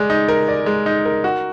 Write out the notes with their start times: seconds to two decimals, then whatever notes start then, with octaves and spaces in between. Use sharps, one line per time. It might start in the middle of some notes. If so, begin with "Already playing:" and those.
Already playing: G#3 D5
0.10 D#4
0.29 A#4
0.48 D5
0.66 G#3
0.86 D#4
1.05 A#4
1.24 F#4